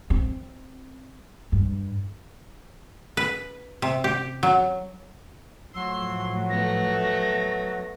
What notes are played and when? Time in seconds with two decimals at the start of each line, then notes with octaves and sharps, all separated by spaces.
0.10 C4
1.52 G2
3.17 B4
3.82 C3
4.04 G4
4.43 F#3
5.74 A2 F3 F#3 C6 E6
6.50 A3 B3 A#6